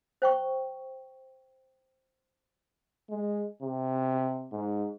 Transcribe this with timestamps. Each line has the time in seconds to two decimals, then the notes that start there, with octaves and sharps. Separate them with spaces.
0.22 C5 G5 C#6
3.10 G#3
3.63 C3
4.52 G#2